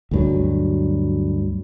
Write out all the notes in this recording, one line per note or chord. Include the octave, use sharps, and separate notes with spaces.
D2 G2 F#3